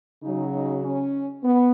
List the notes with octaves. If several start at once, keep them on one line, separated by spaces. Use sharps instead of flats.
C#3 F#3 D#4
D#4
C#4
B3